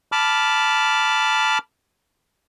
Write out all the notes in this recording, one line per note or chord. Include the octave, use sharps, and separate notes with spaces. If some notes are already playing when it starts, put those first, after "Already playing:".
A5 B5 D6 F6